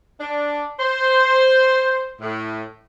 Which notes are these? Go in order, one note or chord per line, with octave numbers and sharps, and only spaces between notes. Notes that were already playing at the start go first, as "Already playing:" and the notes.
D4
C5
A2